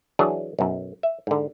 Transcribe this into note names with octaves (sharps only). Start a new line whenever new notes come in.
E3 F#3 D4 G#4
B1 F#2
E5
G#2 D3